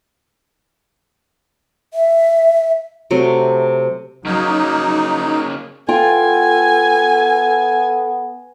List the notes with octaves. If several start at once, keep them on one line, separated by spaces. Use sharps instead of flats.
E5
C3 F#3 A3
C#3 F#3 A#3 D#4
B3 F4 A4 G5 G#5